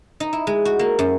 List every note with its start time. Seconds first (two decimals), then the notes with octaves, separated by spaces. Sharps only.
0.20 D#4
0.33 E4
0.47 G#3
0.65 F#4
0.79 A#3
0.99 F#2